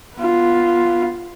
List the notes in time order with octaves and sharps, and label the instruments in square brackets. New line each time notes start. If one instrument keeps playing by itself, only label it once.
[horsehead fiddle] B3 F4